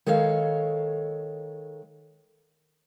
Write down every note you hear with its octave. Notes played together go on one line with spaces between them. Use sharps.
D#3 G#3 A4 C#5 F5